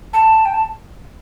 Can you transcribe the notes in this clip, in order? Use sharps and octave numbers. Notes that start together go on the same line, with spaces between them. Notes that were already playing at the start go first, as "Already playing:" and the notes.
A5
G5
A5